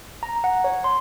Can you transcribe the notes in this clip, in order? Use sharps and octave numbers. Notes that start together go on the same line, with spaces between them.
A#5
F#5
C#5
C6